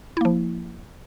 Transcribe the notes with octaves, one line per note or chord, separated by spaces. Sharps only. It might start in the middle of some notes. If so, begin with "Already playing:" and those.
F3 A#3 E4